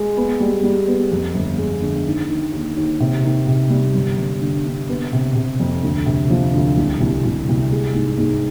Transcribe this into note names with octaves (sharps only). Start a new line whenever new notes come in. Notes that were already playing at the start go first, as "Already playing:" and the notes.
Already playing: G#3
B3
G3
G3
B3
F2
G1
G#3
D3
D#3
D#3
D#2
D#2
C3
D#3
C3
G3
G1
G1
D3
D3
B3
C3
C3
F2
D2
C3
F3
D2
C2
C2
C2
C2
G#3
G#2
G#2